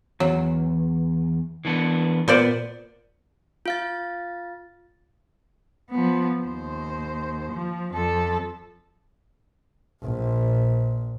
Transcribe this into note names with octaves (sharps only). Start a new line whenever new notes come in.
E2 F#3
E3 B3 D4
A#2 B3 C5 D5
F4 F5 A6
F3 B3
D#2 C5
F3
F2 A4
A#1